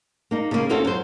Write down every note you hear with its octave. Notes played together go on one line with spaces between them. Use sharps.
A#3 D#4
C#3 A#3
A#3 C4 C#4 F4 F#4 A4
F#2 C5